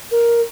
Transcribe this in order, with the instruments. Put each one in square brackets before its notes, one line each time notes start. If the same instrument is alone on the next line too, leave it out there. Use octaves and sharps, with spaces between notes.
[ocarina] A#4